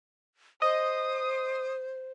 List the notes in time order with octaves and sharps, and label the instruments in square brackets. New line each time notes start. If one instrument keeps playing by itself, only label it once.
[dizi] C5 [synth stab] D#5 [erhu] D#6